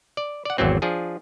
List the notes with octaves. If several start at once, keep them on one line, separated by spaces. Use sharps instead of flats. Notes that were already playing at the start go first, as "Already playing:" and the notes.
D5
D5 F#5
G#1 E2 E3 F#3 C4
F3 D4 G#4